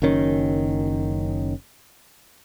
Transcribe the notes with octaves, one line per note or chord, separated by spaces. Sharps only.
F#1 F#2 D#3 C#4